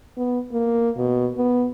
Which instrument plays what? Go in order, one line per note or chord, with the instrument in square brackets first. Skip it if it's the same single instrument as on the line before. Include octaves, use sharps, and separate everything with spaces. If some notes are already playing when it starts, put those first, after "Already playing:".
[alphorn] B3
A#3
B2
B3